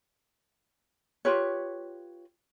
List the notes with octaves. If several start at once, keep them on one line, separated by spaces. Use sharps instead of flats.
F4 G4 B4 C#5